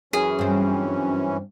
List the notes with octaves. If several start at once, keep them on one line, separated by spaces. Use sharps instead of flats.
F#2 E3 C#4 G#4
G2 C4